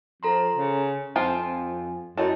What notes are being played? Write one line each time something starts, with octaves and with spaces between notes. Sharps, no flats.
F3 A4 A#5 C6
C#3
F2 F3 C4 F4 G#5
F#2 E4 A4 C#5 D#5